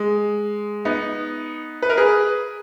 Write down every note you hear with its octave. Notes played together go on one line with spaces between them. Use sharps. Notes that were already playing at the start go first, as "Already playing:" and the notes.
Already playing: G#3
B3 D#4
B4
A#4
G#4 B4